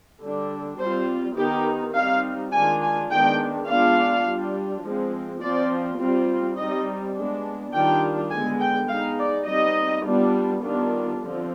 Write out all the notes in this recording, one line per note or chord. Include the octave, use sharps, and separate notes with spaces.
D3 G3 D4
G3 C4 F4 C5
D#3 B3 D#4 G4
G3 C4 D#4 F5
D#3 G#3 D4 F4 G#5
G#5
D#3 G#3 B3 D4 G5
G#3 B3 D4 F4 F5
G3 D4 F4
F3 G#3 C4
F3 C4 F4 D5
G3 C4 F4
G3 C4 D#4 D#5
G#3 B3 D4
D#3 G3 D4 F4 G5
D3 G#3 B3 G#5
G5
G#3 B3 D#4 F5
D5
G3 C4 D#4 D#5
G3 B3 D4 F4
D#3 G3 B3 D4 F4
D3 F3 C4 F4